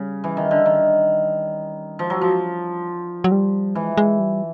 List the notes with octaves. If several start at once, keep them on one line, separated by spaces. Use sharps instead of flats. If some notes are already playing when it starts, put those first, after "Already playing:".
Already playing: C#3 G3
E3
D#3
D3
D#3
F3 G#3
F#3
F3
G3
F#3
G3
E3 G#3
G#3
G3